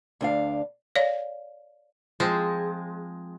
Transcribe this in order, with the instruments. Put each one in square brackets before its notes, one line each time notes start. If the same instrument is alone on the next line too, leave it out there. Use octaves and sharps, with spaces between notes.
[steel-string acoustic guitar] D2 D4 F5
[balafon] C#5 D5 F5
[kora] F3 C4 [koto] G#3